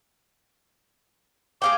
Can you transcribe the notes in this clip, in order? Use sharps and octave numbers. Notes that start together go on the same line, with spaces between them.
G#4 F5 G5 D6